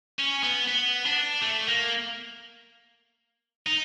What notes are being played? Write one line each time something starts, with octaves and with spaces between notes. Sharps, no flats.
C#4
B3
B3
D4
A3
A#3
D#4